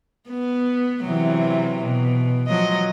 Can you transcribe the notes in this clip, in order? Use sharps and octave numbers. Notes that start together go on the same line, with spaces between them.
B3
C3 E3 F#3
B2
F3 F#3 D#5